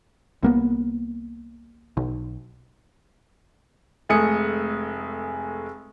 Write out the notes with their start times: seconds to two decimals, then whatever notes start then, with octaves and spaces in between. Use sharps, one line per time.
0.43 C2 A#3 B3
1.97 B1
4.09 F1 G#3 A3 G#5 D#6 C#7